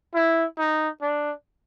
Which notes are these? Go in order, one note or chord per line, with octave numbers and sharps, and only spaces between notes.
E4
D#4
D4